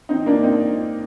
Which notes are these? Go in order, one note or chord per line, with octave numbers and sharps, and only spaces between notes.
C4 D#4
A#3 D4
C4 D#4